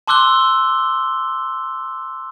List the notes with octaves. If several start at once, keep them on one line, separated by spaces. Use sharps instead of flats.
A5 C6 D6 E6 F#6 G7